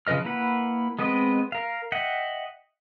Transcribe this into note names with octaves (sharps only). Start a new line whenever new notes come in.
C#3 F3 B4 D#5 F6
A#3 E4 B4 F#5
G#3 B3 C4 B4 D#5
A#4 F5
D#5 E5 F#5 G5